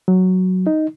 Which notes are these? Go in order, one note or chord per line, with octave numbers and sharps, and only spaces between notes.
F#3
D#4